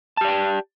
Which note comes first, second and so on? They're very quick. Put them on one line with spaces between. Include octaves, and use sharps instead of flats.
A5 G4 D5 G5